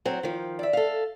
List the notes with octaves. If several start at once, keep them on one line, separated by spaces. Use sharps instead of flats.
F#3 C4
D#3 F3
D5 E5
A4 F5